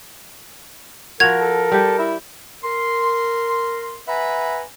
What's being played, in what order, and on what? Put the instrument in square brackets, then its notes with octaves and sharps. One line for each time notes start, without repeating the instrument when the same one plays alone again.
[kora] F3 F#4 [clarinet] A#4 [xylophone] G#6 F7
[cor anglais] A4
[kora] G3 G4 [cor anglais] A4
[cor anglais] E4
[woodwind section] A#4 C6
B4 E5 F#5 G#5 A#5 B5